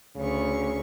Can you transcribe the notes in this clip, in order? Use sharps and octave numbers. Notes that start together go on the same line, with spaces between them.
D2 C#3 C#6